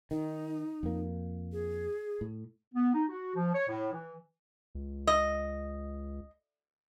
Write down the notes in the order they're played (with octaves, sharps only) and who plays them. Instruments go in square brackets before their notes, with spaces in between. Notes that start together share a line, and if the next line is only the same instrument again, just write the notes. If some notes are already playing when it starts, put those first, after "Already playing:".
[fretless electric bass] D#3 [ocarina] D#4
[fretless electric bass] F2 A#3
[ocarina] G#4
[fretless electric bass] A2
[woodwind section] B3
D#4
F#4
F3
C#5
A2
E3
[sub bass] C#2
[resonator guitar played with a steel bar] D#5